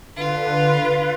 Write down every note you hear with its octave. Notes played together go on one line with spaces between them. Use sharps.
D3 F4 B4